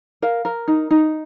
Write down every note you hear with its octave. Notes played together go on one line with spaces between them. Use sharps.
A#4 F5
A#4
D#4
D#4